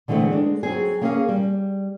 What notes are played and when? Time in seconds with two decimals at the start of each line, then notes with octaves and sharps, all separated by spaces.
0.08 D3 E3 G#3 A3 C4
0.32 G#3 D4
0.63 F#3 C4 G#4
1.01 A#3 C#4 G#4 A#4 E5 F5
1.29 G3